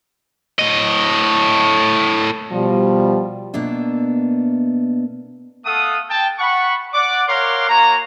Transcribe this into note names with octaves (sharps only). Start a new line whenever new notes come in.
A2 D#5
B2 F3 G3
B2 A#3 B3 D4 E5
A3 A4 F5 F#5 D#6
G5 A5
F#5 B5 C#6
D5 F#5 D6
A#4 C#5 F5 F#5 C6 D6
A#3 F#4 C#5 A#5